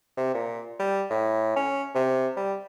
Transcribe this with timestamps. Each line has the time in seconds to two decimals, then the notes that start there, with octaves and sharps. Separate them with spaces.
0.17 C3
0.34 A#2
0.79 G3
1.10 A2
1.56 C#4
1.95 C3
2.37 G3